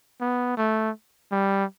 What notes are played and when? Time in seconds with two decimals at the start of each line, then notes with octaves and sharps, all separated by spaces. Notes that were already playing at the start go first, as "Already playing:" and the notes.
0.21 B3
0.57 A3
1.32 G3